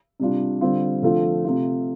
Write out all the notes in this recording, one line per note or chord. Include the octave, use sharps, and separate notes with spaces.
C3 G3 D4 F4
D3 G3 C4 F4
D3 F3 A3 C4 F4
C3 A3 F4